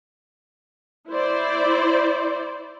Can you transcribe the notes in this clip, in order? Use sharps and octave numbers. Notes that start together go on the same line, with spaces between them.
E4 C5 D5